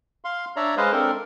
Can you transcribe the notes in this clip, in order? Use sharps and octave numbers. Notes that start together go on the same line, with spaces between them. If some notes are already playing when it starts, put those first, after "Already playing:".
F5 C6
D4 C#5 D5 E5 A#5
G#3 B4 C5 D#5 F5
C4 D4 A4 A#4